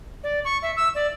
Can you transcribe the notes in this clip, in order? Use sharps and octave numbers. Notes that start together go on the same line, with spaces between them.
D5
C#6
E5
E6
D5